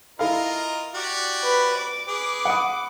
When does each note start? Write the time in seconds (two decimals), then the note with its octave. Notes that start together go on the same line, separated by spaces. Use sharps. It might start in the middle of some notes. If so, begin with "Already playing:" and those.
0.19 E4 F4 A4 A#4 D#5 F5
0.95 F#4 G4 D5
1.43 B4
1.77 D6
2.07 G#4 B4
2.45 F#5 B5 D#6